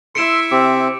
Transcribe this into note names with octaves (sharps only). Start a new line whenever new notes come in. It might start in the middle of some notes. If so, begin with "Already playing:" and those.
E4 E5 C6 C#7 D7 E7
C3 C4 D6